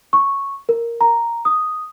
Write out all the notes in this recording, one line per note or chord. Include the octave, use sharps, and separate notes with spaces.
C#6
A#4
A#5
D#6